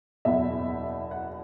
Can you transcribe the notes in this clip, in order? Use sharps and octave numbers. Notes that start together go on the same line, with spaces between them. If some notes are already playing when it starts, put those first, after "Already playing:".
F#1 E2 B2 E5
F#5